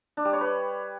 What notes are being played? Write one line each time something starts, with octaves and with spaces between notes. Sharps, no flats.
D4
G3
C#5
B4